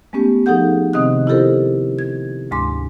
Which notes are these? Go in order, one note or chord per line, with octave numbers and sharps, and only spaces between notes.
G#3 A3 B3 C#4 G4
F3 D#4 G#4 A4 F#5 G6
C3 D#3 C4 D#5 D#6 F#6
E4 F4 G4 A4 A#4 C5
G#6
D2 G#2 G#3 C6 D6